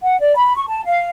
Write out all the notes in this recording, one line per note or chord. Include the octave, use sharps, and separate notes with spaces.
F#5
D5
B5
C#6
A5
F5